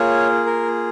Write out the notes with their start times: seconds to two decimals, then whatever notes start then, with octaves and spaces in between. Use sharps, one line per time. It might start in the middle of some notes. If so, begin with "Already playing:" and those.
Already playing: A#3 F4 G#4 C#5
0.46 A#4